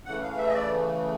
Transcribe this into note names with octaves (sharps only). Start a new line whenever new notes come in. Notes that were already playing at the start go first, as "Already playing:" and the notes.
C#3 E3 A3 F#5
F5
E5
D#5
D5